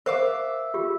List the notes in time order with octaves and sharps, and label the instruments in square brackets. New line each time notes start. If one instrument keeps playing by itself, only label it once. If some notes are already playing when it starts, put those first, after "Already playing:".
[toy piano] A#4 C5 [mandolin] E5 F5 D6
[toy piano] F4 G4